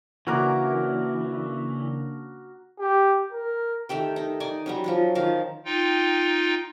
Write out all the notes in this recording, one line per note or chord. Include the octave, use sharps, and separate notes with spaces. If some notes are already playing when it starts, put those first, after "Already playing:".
C#3 E3 A#3 D4 F#4 A#4 D6
G4
A#4
D#3 A3 G4 G5
D#4
D#4 D5 G#5 D6
F#3 G3 C#4
F3 F#3 C#4
D#3 F3 A#4 F5
D#4 F4 G5